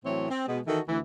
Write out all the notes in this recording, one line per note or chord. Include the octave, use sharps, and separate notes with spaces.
A2 E3 F#3 C4 C#5
C4
B2 G#3
D#3 E3 F#4 A4
D2 E3